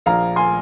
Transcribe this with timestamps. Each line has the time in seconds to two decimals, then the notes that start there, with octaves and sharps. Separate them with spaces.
0.06 A#1 A#2 F3 F5 A#5
0.36 G#5 C6